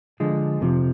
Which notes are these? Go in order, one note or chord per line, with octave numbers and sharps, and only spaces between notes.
D3 F3 G#3
F2 C3 F3